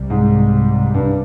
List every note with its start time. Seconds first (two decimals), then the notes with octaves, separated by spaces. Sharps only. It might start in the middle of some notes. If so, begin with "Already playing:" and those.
Already playing: C2 C3 G3
0.10 G#2
0.94 G2